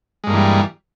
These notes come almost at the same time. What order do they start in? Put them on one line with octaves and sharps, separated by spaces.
G#3 G2 A#3 E3 G3